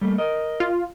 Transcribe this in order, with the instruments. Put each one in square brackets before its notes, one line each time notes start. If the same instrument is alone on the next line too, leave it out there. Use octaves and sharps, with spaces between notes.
[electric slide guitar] G3 A3 A#3
A#4 D#5
[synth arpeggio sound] F4